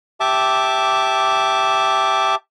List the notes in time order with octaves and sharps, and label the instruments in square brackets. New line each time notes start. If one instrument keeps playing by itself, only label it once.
[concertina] G4 E5 A5 D6